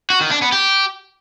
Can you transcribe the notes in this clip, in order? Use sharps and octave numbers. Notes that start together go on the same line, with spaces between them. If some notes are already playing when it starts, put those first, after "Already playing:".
F#4
D#3
D4
B3
G4